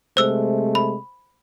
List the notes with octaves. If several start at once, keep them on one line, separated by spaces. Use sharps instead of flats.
C3 G#3 A3 C5 E6
B5